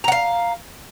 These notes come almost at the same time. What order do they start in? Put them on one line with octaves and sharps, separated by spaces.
A#5 F#5 F5